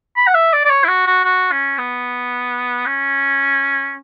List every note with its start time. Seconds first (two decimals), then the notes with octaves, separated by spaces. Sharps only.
0.17 B5
0.27 F#5
0.34 E5
0.53 D5
0.65 D5
0.70 C#5
0.84 E4
0.88 F#4
1.07 F#4
1.24 F#4
1.52 C#4
1.78 B3
2.86 C#4